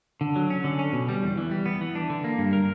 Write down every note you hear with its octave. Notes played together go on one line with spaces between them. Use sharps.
D3
F#3
C#4
D3
C#4
B2
G3
E2
E3
G3
B3
E3
D4
D3
A#3
G2
A#4